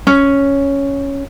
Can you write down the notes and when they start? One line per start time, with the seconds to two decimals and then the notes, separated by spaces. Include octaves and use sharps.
0.07 C#4